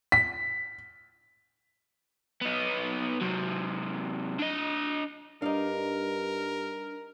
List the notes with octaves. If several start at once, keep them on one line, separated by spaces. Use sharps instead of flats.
B6
B3 D#4
C3 F#3
D4 D#5
G2 D4 D#4 A#4 D5 F5